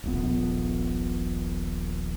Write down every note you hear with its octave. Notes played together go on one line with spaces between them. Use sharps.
D#1 A#1 B3